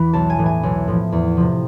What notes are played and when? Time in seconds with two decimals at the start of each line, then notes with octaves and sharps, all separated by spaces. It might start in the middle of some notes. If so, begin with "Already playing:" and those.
Already playing: E2 E3 B5
0.13 B1 A5
0.30 G#5
0.39 A2 E3
0.46 G#5
0.63 B1
0.88 A2 F3
1.12 E2
1.37 C3 F3